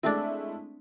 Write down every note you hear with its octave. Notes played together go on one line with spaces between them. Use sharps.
G#3 A3 C4 D4 E4